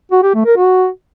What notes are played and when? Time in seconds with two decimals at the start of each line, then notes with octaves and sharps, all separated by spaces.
0.12 F#4
0.23 G4
0.34 A3
0.46 A#4
0.57 F#4